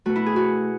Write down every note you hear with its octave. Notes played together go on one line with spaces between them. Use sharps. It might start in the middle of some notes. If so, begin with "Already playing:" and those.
B2 A3 F#4
E4
G#4
F#4